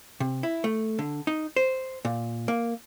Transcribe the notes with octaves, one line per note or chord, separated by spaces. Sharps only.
C3
E4
A3
D3
D#4
C5
A#2
A#3